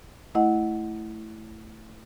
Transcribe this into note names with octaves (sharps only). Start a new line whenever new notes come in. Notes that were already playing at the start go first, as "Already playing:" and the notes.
A3 E4 D#5 F#5